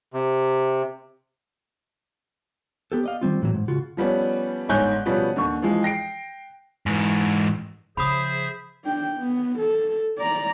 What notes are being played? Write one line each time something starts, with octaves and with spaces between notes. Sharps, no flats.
C3
B3 G4 A4
D5 D#5 F5
D#3 G3 C4 F4
A2 E3 F#3
G#2
C#3 F4 F#4
F3 G3 B3 C#4
G1 G#2 C#5 G#5 F#6 G6
B2 F3 G3 B3 C#4
D#2 D3 C#6
E3 F3 G#3
G5 A#6 C7 D7
G#2 E3
C#3 F3 G#4 C5 E5 B5 D#6
D4 G5
B3
A4
D5 A#5